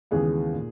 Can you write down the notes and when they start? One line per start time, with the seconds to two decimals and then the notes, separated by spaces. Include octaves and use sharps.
0.11 D#2 C#3 E3 G#3 B3 G#4
0.54 A#2